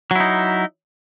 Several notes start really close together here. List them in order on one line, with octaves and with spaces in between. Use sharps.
F#3 E4 D#4